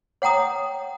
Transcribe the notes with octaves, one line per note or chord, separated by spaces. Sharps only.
C#5 F#5 G5 A#5 D#6